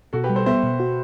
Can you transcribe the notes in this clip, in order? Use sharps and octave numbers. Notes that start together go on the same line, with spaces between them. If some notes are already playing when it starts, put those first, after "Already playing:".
B2 F#4 A4
G4 B4
G3
A4 C5
B3 C5 E5
B2
F#4